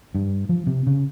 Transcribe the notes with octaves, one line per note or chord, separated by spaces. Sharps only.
G2
F3
C3
C#3